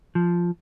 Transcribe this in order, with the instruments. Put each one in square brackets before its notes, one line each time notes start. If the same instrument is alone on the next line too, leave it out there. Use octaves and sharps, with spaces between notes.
[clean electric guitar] F3